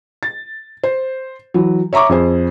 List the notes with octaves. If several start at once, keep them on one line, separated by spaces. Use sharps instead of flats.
A6
C5
E3 F#3
C#5 E5 A#5 C#6 D6
F2 G#4 C5